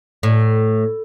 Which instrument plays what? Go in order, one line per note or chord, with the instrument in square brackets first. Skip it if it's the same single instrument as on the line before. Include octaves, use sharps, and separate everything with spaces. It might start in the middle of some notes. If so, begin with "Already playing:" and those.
[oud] A2